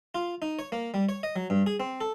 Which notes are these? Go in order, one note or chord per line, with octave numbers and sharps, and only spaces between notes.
F4
D#4
C#5
A#3
G3
C#5
D#5
F#3
G2
G#4
C4
A4